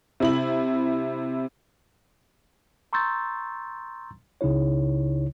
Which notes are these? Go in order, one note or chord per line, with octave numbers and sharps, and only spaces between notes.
C3 E4 F#7
A#5 C6 C#6 E6 G6 A6
C#2 C#3 D#4 E4 C#5